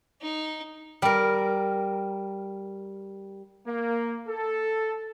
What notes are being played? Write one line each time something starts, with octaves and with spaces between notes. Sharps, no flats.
D#4
G3 A#4
A#3
A4